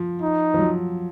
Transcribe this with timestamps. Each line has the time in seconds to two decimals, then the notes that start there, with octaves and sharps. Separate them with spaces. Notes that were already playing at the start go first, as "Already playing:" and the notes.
Already playing: F3
0.22 D#4
0.54 F3
0.59 F#3